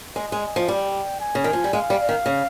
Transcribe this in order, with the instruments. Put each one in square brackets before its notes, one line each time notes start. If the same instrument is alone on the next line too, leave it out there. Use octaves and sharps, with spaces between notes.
[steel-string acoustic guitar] G#3 [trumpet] D#5
[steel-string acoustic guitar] G#3
F3
[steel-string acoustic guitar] G3 [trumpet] G5
[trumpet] G#5
[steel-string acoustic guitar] C#3
D#3
F3
G3
[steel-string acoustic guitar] G#3 [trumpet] F5
[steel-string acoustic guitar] G3
D#3
C#3